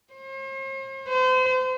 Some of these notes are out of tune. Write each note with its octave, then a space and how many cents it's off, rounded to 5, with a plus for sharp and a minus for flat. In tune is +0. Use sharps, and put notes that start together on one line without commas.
C5 +45
C5 -35